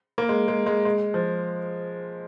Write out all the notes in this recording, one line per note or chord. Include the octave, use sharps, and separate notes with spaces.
A#3
G#3
G#3
G#3
G#3
F3